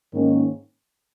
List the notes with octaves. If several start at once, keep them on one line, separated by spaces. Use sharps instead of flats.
G#2 D#3 A#3 C#4